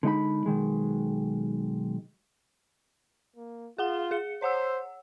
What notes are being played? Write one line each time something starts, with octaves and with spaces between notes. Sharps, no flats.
D3 G#3 D#4 B5
B1 D#3 G#3
A#3
F4 G#4 F#5 G7
G#4 C#7
C5 C#5 F#5 E6